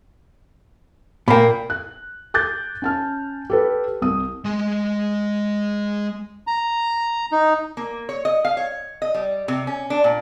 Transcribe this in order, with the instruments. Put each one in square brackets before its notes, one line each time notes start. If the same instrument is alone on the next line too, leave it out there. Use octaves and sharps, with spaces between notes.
[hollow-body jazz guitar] A#2 A#3 [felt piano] G5 B5
[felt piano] F#6
D6 F#6 G6 A6
C#4 A5 F6
G4 A4 B4
C2 D#6
[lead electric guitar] G#3 C6
[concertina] A#5
D#4
[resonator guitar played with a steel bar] A#3
C#5
D#5
F5
C#5
D#5
G3
C3
C#4
D4
A#2